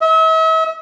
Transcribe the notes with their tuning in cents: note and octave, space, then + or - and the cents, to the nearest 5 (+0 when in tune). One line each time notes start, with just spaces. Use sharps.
E5 -40